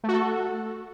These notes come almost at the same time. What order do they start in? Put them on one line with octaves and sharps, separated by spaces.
A3 F#4 A4